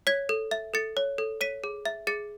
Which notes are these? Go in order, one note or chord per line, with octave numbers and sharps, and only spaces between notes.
C#5 G#6 B6
A4
E5
A4 A6 C#7
C#5
A4
C#5 B6 D#7
G#4
E5
G#4 A6 C#7